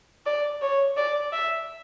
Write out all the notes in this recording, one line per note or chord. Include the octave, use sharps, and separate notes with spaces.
D5
C#5
D5
E5